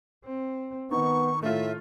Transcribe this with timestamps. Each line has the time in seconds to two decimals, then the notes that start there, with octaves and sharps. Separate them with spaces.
0.25 C4
0.91 D#3 B3 D#4 C#6
1.43 A2 A3 F4 E5